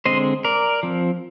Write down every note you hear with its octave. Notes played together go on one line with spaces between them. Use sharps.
D3 G#3 C4 C5 D#5
A#4 D5
F3 C4